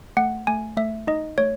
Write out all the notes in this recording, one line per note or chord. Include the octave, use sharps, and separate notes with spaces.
A3 F#5
A3 G#5
A3 E5
D#4 D#5
A3 C#5